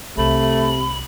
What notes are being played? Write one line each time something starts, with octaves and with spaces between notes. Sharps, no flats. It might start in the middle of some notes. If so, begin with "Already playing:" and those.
C2 C3 A3 B5